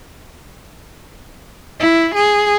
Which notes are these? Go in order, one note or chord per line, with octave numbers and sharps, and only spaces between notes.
E4
G#4